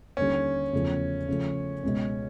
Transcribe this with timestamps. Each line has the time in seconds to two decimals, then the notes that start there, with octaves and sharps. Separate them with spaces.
0.17 D#2 D3 G3 C#4
0.73 E2 C#3 F3 A3
1.28 C#3 F3 A3
1.83 C#2 B2 G#3